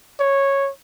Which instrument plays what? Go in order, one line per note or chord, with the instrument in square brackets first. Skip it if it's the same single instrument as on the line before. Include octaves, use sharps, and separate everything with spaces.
[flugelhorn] C#5